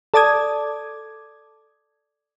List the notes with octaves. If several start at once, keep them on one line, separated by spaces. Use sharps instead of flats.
A4 D5 A5 D6 D#6 G#6